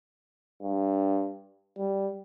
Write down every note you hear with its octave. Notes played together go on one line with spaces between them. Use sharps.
G2
G3